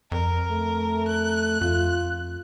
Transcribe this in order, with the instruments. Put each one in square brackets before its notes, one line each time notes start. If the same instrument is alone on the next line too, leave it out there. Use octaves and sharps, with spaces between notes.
[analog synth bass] F2 [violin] A#4
[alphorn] A3
[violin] F#6
[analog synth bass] F2 [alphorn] F4